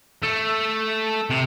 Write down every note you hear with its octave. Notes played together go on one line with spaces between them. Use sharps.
A3
C3